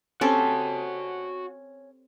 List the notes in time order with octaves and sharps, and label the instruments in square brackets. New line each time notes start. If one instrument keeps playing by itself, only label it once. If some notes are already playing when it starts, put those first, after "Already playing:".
[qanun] C4 G4 A4 [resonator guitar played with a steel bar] C#4 [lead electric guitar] F#4 A5